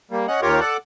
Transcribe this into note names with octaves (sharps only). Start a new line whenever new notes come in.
G3 A#3
C#4 D#5 F#5
D#2 F4 G4 A#4 C#5
A4 D5 F#5